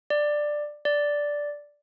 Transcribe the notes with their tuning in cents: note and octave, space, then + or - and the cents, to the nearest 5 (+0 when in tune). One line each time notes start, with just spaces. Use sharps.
D5 +10
D5 -5